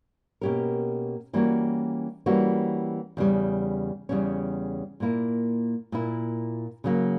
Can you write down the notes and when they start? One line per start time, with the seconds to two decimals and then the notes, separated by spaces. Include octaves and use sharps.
0.41 B2 A#3 C#4 G4 A#4
1.33 E3 G3 A#3 C#4 F#4
2.26 E3 G3 A#3 C#4 F#4
3.17 E2 C#3 G3 C#4
4.09 E2 C#3 G3 C#4
5.00 A#2 A#3 E4
5.92 A#2 A#3 E4
6.84 C#3 F#3 A#3